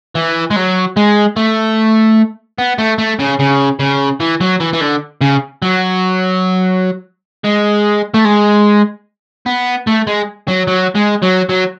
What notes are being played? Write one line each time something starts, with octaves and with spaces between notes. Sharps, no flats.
E3
G#3
F#3
G#3
A3
B3
A3
A3
C#3
C#3
C#3
E3
F#3
E3
E3
D3
C#3
F#3
G#3
A3
G#3
B3
A3
G#3
F#3
F#3
G#3
F#3
F#3